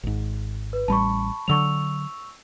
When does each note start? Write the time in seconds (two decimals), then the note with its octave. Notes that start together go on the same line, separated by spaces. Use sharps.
0.03 G#1 G#2
0.73 B4
0.88 A1 G3 A5 B5 C#6
1.48 D3 F#3 C#6 E6 F7